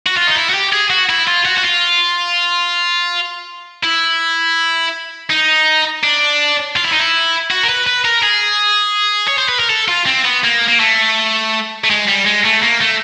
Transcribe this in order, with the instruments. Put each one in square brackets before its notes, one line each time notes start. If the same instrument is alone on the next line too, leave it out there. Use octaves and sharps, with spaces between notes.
[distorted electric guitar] F#4
F4
D#4
E4
F#4
G4
G#4
F#4
E4
F4
F#4
F#4
F4
E4
D#4
D4
F4
E4
D#4
E4
F#4
A#4
B4
B4
A#4
G#4
C#5
C5
B4
A#4
A4
F4
C4
B3
A#3
A#3
A3
A3
G#3
G3
G#3
A3
A#3
A3